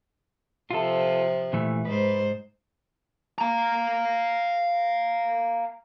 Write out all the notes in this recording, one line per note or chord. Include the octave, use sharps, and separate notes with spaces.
C3 F3 F4 A4
A#2 E3 A3
G#2 B4 C5
F5 A#5